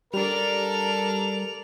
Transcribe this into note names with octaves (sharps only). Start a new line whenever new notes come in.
G3 D4 A4 A#4 D5 F7